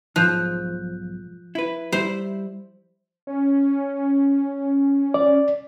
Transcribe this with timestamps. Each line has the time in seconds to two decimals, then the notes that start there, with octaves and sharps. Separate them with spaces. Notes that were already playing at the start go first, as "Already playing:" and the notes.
0.16 B1 G#2 F3 F#6 G6
1.55 E4 B4
1.92 G3 E4 C5
3.27 C#4
5.14 D5